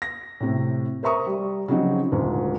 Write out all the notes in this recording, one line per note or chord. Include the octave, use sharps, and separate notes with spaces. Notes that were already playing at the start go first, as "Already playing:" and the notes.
A#6
A2 C3
A#4 C5 E5 A#5 C#6 D#6
G3
C#3 F3 F#3 C4 D#4
D#1 D2 G#2